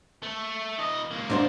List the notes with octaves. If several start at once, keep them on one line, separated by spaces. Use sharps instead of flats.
A3
E3 D#5
C#2 A#3
G#2 D4 C5